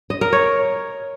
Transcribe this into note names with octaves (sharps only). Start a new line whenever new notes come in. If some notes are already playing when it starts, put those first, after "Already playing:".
D#5
A#4
C#5